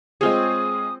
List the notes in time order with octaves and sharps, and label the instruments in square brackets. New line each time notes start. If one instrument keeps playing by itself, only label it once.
[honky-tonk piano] G#3 F4 G#4 [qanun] C4 C#5 [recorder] D#6